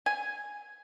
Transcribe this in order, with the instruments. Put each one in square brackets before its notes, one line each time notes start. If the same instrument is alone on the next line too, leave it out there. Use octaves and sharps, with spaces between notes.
[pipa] G#5